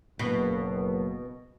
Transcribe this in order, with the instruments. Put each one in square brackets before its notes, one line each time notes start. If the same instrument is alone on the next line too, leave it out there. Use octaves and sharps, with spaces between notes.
[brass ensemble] F#1 [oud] B2